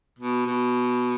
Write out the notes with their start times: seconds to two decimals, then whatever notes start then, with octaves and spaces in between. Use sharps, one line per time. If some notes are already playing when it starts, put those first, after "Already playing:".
0.19 B2
0.46 B2